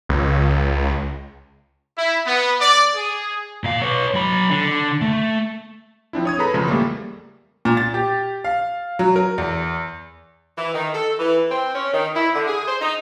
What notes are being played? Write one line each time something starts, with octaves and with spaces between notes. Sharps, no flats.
C#2
E4
B3
D5
G#4
A#2 F5
B4 C#5
F#3 B5
D3
A3
F3 C4 D4 E4
C#5 D#6 G#6
G#4 A4 B4 A#5 B5
A1 C#3 F3 G#3
E2 G3 A3 A#3
A#2
A6
G4
F5
F#3
A#4
E2
E3
D#3
A4
E3
C4
C#4
D#3
E4
D3
G#4
C5
D#4